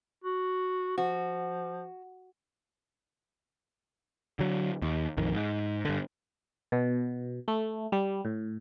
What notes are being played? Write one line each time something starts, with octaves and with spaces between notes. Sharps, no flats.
F#4
F3 F#4
D3 F#3
D#2
A#1 F2 D#3
G#2
G2 D3
B2
A3
G3
A2